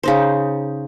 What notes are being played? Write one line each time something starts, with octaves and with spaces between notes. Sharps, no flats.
C#3 D#4 C5